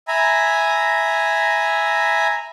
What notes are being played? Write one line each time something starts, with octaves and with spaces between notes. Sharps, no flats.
E5 G#5 A#5 B5